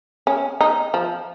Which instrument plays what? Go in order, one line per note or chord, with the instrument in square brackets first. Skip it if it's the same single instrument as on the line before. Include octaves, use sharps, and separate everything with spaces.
[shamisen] C#4
D#4
F3